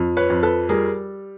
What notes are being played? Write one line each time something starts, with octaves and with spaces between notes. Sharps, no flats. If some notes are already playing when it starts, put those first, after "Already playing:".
Already playing: F2
B4 C#5
F2
A4 B4
G3 G#4 A#4